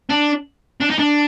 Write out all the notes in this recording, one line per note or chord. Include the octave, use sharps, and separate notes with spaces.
D4
D4
D#4
D4